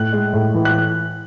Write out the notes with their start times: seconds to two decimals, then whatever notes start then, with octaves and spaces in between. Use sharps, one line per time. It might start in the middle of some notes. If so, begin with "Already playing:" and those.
Already playing: A2 F#6
0.13 G#3
0.33 A2
0.54 E3
0.65 F#6